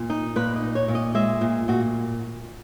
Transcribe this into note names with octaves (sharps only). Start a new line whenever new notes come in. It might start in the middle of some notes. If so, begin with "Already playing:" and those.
Already playing: A#2
D#4
A#2 B4
D#5
D#4
C#5
A#2
D#5
G#3 E5
A#2
A#2 F#4